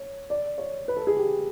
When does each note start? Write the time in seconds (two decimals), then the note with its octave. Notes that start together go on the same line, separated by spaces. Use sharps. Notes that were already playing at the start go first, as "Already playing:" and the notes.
Already playing: C#5
0.30 D5
0.58 C#5
0.88 B4
0.97 A4
1.07 G#4
1.17 G4